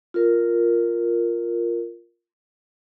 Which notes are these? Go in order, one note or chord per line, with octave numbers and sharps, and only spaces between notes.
F4 A#4